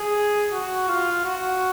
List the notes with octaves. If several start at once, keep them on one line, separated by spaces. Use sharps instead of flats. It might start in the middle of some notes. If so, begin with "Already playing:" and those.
Already playing: G#4
F#4
F4
F#4